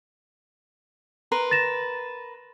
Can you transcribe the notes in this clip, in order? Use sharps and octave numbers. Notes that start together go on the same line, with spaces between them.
A#4 B4 C6
A6 A#6 E7